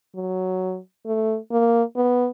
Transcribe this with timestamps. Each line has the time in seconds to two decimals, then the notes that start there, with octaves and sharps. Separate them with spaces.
0.16 F#3
1.06 A3
1.52 A#3
1.96 B3